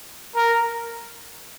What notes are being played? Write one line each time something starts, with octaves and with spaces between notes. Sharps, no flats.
A#4